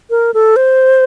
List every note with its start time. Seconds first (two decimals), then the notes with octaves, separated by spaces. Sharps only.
0.10 A#4
0.34 A4
0.56 C5